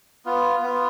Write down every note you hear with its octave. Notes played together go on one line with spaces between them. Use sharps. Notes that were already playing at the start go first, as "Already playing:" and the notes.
B3 F4
B3 F4